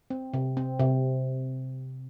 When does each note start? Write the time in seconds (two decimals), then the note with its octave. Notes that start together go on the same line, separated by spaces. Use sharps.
0.10 C4
0.34 C3
0.57 C4
0.79 C3